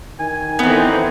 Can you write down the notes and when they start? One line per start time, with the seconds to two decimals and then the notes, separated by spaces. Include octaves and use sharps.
0.20 D#3 G#5
0.59 D3 E3 B3 C4 D#4